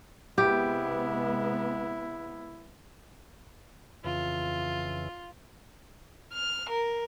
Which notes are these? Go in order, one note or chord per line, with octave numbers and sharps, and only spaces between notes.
C3 G#3 B3 E4 G4
F2 C#3 E3 F4
F6
A#4